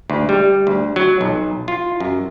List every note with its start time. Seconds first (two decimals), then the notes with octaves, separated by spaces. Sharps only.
0.10 D2
0.29 G3
0.67 D2
0.96 F#3
1.21 B1
1.68 F4
2.00 F#2